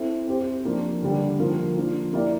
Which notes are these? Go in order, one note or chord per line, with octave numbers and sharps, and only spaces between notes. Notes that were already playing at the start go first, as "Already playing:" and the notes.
Already playing: C4 E4 A4
C4 G4 C5
F3 A#3 D4
D3 G3 D4
F3 A#3 F4 A#4 F5
F3 A#3 D4 F4
A#3 E4 G4 A#4 D5